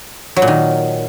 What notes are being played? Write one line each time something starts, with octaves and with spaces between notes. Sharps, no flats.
F#3
A#2
D#3